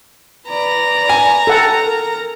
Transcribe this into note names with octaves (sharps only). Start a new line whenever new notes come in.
B4 D5 A#5
G#5
A4 F#5 G5
A#4